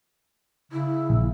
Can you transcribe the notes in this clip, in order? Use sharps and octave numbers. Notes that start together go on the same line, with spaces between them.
C#3 E4
A#1